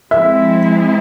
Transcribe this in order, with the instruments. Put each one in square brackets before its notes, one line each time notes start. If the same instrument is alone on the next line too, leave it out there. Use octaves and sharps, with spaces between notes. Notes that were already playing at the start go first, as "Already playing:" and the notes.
[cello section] F3 G#3 C4 E4 [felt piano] E5